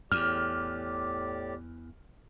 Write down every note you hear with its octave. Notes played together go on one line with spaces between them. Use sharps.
E2 A2 G4 D5 F6